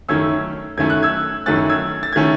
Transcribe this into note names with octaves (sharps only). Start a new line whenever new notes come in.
F#2 D#3 A3 C#4 E6 G#6
F#2 D#3 A3 C#4 G#6
F#6
E6 G#6
F#2 D#3 A3 C#4 F#6 A6
E6 G#6
A6
D#3 A3 C#4 G#6